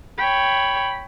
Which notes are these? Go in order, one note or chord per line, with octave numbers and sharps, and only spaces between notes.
C#5 G5 B5